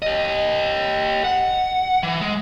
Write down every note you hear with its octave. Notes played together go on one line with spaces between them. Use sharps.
G4 D#5
F#5
E3
G#3